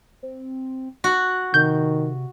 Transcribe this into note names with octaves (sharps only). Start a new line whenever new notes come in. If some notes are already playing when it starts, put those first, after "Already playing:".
C4
F#4 F#6
C3 D#3 G6